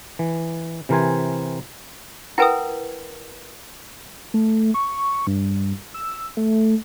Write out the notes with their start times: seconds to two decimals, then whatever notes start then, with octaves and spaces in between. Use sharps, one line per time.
0.19 E3
0.89 C3 E3 A#4 C5 G#5
2.38 E4 A#4 B4 F#5 G5 D#6
4.34 A3
4.74 C#6
5.27 G2
5.94 E6
6.37 A3